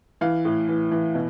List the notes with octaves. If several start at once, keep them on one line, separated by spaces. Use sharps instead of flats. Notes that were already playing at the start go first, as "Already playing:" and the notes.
E3 F5
A2
E3
E3
B2